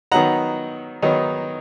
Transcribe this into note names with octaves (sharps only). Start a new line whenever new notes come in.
D#3 F#3 B3 D#4 F#5 A#5
D#3 F#3 B3 D#4